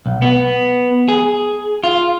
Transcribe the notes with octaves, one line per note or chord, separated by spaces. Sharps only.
B1
B3
G#4
F4